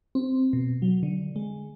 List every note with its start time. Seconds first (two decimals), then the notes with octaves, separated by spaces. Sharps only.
0.15 C4
0.53 B2
0.82 F#3
1.03 D3
1.36 G#3